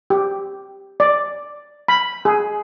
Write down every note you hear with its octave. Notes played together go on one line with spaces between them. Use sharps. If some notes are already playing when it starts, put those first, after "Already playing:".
G4
D5
B5
G#4